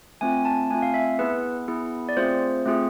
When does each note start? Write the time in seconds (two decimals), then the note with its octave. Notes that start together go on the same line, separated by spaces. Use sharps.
0.21 A3 C4 F4 G#5
0.45 A5
0.70 A3 C4 F4 G#5
0.82 F5
0.94 E5
1.19 B3 E4 G#4 B4
1.68 B3 E4 G#4
2.09 D5
2.17 A3 C4 F4 G#4 C5
2.66 A3 C4 F4 G#4